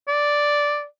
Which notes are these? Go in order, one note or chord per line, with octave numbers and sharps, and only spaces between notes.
D5